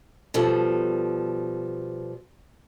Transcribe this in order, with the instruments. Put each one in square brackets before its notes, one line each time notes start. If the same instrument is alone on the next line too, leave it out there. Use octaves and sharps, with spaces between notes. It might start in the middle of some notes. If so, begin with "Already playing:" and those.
[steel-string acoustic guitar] B2 F3 G3 A4